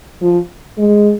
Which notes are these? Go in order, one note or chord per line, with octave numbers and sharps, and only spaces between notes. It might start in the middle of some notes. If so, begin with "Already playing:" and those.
F3
G#3